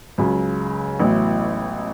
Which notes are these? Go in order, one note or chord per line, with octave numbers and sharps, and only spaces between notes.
C#2 C#3 F#3
A1 A2 F#3 B3 E4